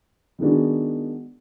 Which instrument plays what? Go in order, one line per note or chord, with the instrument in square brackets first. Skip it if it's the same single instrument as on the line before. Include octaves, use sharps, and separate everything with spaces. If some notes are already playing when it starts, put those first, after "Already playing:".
[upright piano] D#3 G#3 B3 D4 F#4